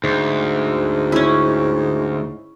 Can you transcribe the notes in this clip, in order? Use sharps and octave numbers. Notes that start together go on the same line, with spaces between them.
D2 G#2
C#4 E4